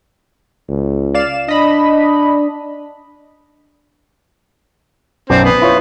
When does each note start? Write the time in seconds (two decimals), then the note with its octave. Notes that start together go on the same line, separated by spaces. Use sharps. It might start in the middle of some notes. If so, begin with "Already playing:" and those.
0.69 C#2
1.14 D5 F5 E7
1.48 D4 D#5 B5
5.30 B1 F#2 C4 D5
5.45 B3
5.62 E4 F4 C#5